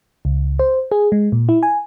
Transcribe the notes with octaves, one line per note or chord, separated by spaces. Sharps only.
C#2
C5
G#4
G#3
A#2
E4
G#5